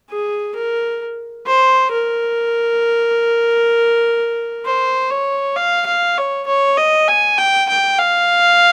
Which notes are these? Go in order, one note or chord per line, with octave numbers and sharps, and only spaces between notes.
G#4
A#4
C5
A#4
C5
C#5
F5
F5
C#5
C#5
D#5
G#5
G5
G5
F5